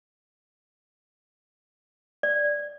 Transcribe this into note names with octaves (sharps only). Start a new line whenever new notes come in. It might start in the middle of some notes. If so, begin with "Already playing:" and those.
D5